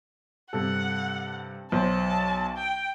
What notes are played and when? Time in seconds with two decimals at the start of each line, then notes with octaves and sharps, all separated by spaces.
0.53 G2 C3 A4 F#5
1.72 B1 C5 A5
2.57 G5